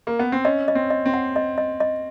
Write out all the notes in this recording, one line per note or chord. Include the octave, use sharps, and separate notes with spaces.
A#3
B3
C4
C#4 D#5
D#5
C4
D#5
C4
F#5
D#5
D#5
D#5